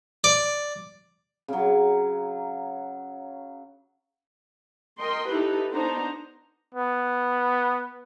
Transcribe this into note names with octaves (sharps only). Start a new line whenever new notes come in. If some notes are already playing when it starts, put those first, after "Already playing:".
D5
C#3 F#3
A#4 D#5 G5 C6
D#4 E4 G4 A4 B4
B3 D4 D#4 C5 A#5
B3